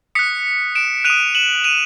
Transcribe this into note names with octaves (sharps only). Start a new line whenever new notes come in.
D#6 F#6 B6 C#7
D7 E7
F#6 D#7 F7
D#6
E7 F#7
D#7 F7